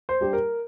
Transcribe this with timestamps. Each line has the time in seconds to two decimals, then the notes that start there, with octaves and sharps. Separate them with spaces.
0.09 C5
0.21 G3 D4 G4
0.33 A#4